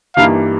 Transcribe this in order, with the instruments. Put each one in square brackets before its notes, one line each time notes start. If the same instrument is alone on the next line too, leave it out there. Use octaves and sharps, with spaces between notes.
[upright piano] G2 E3 G3 A#3 D#4 [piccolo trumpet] F5